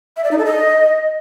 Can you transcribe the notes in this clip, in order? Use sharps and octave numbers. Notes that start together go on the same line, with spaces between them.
E5
D5
D#4
A4
D#5